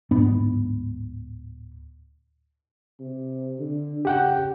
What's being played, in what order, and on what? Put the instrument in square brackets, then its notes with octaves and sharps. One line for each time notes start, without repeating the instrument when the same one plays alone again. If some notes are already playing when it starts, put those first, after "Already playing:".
[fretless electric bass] D1 G#2 B3 D4
[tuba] C3
D3
[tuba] C#3 [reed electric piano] G4 F#5 G5